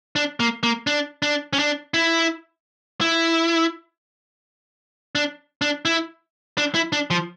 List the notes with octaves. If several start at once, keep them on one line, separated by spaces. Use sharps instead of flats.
D4
A#3
A#3
D4
D4
C#4
D4
E4
E4
D4
D4
E4
D4
E4
D4
F3